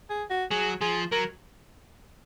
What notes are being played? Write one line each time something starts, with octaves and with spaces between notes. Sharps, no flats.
G#4
F#4
F#3 G#4
F3 G#4
F#3 A#4